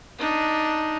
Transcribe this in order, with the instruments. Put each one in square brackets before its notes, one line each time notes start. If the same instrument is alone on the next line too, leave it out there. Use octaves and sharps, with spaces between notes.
[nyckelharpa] D4 D#4